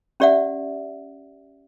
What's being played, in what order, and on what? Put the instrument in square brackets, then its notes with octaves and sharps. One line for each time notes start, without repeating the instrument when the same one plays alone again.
[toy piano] C#4 G4 D5 E5 F#5